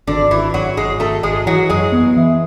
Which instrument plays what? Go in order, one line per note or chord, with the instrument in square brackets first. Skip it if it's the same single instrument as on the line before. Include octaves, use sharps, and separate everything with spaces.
[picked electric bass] G#1 [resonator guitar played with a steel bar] D3 D4
[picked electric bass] G#1 [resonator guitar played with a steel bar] E3 E4
[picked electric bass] G#1 [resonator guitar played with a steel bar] F#3 F#4
[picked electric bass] G#1 [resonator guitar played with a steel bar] G#3 G#4
[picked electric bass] G#1 [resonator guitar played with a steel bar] A3 A4
[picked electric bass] G#1 [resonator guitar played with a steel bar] G#3 G#4
[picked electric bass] E3 [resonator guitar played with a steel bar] F#3 F#4
[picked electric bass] F#2 [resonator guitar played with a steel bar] G#3 G#4
[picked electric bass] B3
E3